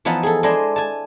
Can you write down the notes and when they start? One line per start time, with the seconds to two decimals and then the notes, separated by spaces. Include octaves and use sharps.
0.05 E3 F3 B3 D#4 F#5 A5
0.23 G#4 A4
0.43 G#3 D4 E4 G#4 C5 D#5
0.76 G#5 A5